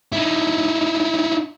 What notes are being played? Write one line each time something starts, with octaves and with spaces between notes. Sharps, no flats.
D#4 E4